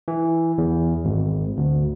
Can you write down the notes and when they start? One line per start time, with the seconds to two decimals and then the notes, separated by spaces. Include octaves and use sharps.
0.08 E3
0.58 E2
1.05 G#1
1.57 D2